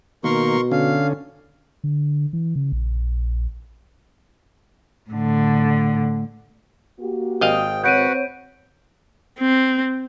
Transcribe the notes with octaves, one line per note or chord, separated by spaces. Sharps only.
B2 D#3 A#3 A#4 C6 C#6
D3 C#4 F5
D3
E3
C#3
A#1
A2 D3
A#3 F#4 G4
G#1 D#5 F5 G5 D#6
C4 F#4 B4 C#5 F#5 G6 D7 D#7
C4